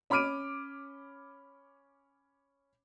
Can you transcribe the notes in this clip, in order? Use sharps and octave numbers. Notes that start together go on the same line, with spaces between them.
C#4 B5 D6 F6 D7 D#7